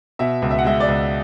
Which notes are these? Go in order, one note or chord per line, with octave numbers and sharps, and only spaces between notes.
B2 E5
C#2
E5
F#5
G#3 E5
D5
C#2